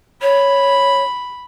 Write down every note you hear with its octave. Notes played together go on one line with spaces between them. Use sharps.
C#5 B5